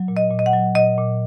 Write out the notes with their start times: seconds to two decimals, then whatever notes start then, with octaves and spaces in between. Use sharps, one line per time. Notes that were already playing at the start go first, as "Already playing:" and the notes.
Already playing: F#3
0.08 A#2
0.17 D#5
0.31 A#2
0.39 D#5
0.46 F#5
0.53 F#3
0.75 A#2 D#5
0.98 A#2